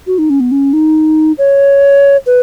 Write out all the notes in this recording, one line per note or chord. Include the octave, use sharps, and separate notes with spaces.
F#4
D#4
C#4
B3
C#4
D#4
C#5
B4